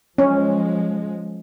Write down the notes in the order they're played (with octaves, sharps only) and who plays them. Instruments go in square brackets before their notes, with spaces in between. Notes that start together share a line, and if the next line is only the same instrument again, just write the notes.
[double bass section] F3 G#3 [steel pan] C#4